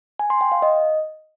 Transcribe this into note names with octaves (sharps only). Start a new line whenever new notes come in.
G#5
C6
G5
F5
D#5